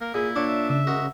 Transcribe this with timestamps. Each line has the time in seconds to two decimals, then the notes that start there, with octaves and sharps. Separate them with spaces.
0.01 A#3 A#4
0.14 A#2 E4 G#4
0.36 A#2 D4 C#5 D6
0.47 E5
0.69 C#3 E5
0.87 G#3 F#4 A#4